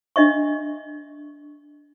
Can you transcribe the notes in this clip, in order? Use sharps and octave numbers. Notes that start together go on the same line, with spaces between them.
D4 D#5 E5 C#6